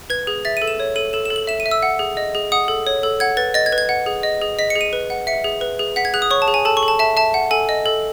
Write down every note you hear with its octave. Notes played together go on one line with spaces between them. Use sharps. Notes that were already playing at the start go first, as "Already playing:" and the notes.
B4 G#6
G#4
E5 A6
A4 D#7
E7
C#5
A4 D#7
A4 E7
A4 E7
F#7
E5 E7
D#7
E5
E6
F#5
G#4
D#5
G#4
F#5 D#6
A4
C#5
A4
F#5 G#6
B4 A6
D#5 A6
G#6
B4
G#6
F#5
G#4
D#5
G#4
D#5 B6
C#7
G#4
D#7
B4
F#5
E5 C#7
G#4
B4
G#4
F#5 B6
G#6
G#4 F#6
D#6
C#5 C#6
A5
G#4
G#5
A4 A5
C#6
A4
A5
E5 A5
E5 A5
F#5
A4 G#5
D#5
A4